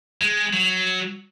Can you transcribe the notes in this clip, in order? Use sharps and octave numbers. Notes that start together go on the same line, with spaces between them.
G#3
F#3